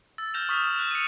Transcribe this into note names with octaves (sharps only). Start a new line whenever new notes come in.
E6 A6
F6 G6 A#6 E7 F7
C#6 D#6 F6 B6
F#7
F#6 E7
C#7 D#7